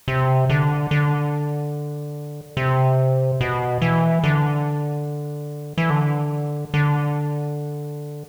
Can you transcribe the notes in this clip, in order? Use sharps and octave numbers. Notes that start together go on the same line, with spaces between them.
C3
D3
D3
C3
B2
E3
D3
E3
D3
D3